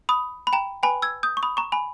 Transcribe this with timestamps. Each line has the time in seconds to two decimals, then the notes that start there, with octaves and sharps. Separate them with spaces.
0.09 B5 D#6
0.47 B5
0.53 G5 A#5
0.83 B4 G5 G#5 B5
1.02 E6 G#6
1.23 D#6 G6
1.37 C#6
1.43 B5 D#6
1.57 A#5 C#6
1.72 G#5 B5